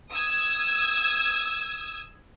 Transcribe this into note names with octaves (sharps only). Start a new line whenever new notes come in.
D#6 E6 G#6